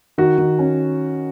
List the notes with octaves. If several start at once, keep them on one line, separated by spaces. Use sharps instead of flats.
D#3 F#4
D#3
C#4